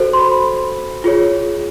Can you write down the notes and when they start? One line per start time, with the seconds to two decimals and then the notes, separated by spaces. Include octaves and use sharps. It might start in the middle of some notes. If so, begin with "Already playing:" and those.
Already playing: F#4 A4 C5
0.13 C6
0.19 B5
1.04 F4 G#4 C#5